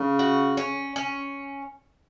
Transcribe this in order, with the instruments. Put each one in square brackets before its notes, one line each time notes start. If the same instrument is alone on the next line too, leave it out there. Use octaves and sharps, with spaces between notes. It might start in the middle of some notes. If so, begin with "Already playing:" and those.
Already playing: [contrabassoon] C#3
[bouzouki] F#4
C#4
C#4